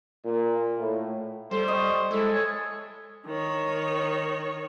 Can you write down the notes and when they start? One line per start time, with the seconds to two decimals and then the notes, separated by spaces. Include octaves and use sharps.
0.24 A#2
0.79 A2
1.51 G3 A4 C5
1.68 D#5 C#6
2.11 G#3 E4 A4
2.33 C#5
3.26 D#3 C#5